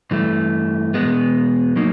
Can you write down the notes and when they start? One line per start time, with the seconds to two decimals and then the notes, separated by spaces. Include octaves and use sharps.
0.11 G2 E3 A3
0.94 E2 B2 G#3 B3
1.76 F#3 A#3 D#4